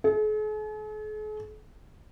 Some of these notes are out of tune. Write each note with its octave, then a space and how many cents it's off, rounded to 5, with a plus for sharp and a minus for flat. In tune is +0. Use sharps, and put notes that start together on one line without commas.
G#4 +45